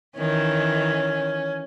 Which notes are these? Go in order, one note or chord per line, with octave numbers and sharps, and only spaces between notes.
D#3 E3 C#4